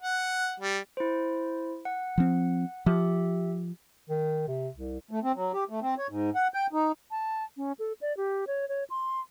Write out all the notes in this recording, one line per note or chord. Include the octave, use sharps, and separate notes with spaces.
F#5
G3
E4 C5
F#5
F3 C4
F3 G4 E5
D#3
C3
C2
A3
C4
F#3
G4
A3
C4
C#5
G#2
F#5
G5
D#4
A5
C#4
A4
D5
G4
C#5
C#5
C6